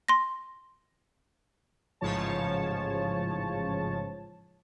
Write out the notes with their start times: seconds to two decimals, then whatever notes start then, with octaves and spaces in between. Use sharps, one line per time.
0.08 C6 A#6
2.01 A1 G#2 C#3 F3 C#5 A5